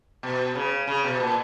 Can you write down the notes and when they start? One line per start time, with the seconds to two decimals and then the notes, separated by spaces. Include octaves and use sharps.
0.23 B2
0.55 C#3
0.87 C#3
1.04 B2
1.20 A#2